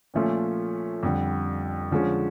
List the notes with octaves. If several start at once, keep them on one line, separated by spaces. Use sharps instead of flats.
A#2 F3 A3 C#4 F4
F2 D3 G3
D3 F3 G#3 C#4